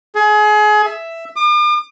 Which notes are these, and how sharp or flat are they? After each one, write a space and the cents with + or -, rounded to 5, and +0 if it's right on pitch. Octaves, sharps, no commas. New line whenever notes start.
G#4 +30
E5 +5
D6 +45